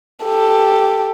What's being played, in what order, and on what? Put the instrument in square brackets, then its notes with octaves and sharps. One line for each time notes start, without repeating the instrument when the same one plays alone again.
[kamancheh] G4 A4